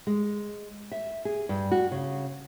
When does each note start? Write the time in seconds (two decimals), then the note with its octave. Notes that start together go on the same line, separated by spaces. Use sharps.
0.07 G#3
0.92 E5
1.25 G#4
1.49 G2
1.71 F#4
1.92 C#3